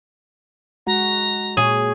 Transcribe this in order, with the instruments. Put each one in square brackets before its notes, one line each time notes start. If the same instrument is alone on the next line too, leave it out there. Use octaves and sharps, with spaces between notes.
[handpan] G#3 F#4 F#5 [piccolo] A#5
[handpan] A#2 C#5 [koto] G#4